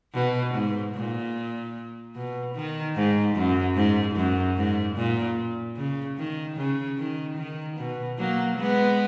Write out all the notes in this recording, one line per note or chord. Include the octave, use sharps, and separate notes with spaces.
B2
G#2
A#2
B2
D#3
G#2
F#2
G#2
F#2
G#2
A#2
C#3
D#3
C#3
D#3
D#3
B2
F#3 A#3
G#3 B3